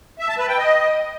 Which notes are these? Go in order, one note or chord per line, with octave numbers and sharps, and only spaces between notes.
E5
A5
B4
G5
D#5